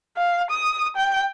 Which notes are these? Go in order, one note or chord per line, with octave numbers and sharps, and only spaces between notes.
F5
D#6
G5